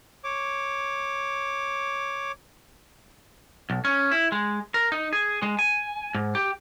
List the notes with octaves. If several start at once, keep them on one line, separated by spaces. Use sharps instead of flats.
C#5 D6
B1
C#4
E4
G#3
A#4
D#4
G#4
G#3
G#5
G#2
G4